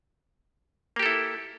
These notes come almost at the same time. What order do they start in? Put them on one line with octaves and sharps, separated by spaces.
A#3 G4 A4 E4